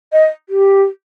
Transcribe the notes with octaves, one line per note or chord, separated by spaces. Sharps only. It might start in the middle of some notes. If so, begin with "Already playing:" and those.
D#5
G4